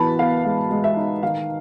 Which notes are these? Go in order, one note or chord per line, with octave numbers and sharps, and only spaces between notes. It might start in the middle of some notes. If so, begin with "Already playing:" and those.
Already playing: E3 B3 A5 B5
B3 F5
G#3 F5
G#3
E5
D#4
D#3 F5